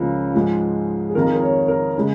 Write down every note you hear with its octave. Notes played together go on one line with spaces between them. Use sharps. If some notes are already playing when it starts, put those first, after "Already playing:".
Already playing: C#2 C#3 F3 A#3
G#2 F3 G#3
G#4
F2 D#3 A#3 A#4
G#4
A#4
C#5
A#4
C#3 G#3